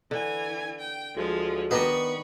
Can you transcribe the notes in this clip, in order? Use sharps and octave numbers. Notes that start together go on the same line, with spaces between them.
D3 E3 G#5
G5
D2 F3 G#3
D#3 B3 D4 D#5 B5 C#6